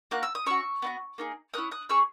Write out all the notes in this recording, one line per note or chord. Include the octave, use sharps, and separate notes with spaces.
A#3 D#4 F#4 F#6
E6
D#6
C#4 F#4 C#6 E6
B3 D#4 F#4
A#3 D#4 G#4
A#3 C#4 E4 D#6 F#6
D#6 F#6
C#4 G#4 C#6 E6